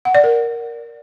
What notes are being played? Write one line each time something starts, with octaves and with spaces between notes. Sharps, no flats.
F#5
D5
A#4